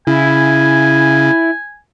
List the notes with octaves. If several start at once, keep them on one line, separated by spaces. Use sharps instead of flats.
C#3 E4 G#5